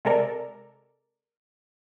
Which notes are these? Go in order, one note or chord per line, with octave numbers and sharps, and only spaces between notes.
C3 G#3 A4 A#4 D5